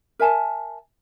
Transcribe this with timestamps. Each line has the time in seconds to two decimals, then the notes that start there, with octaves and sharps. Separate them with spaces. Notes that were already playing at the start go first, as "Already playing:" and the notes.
0.19 A#4 E5 G#5 A5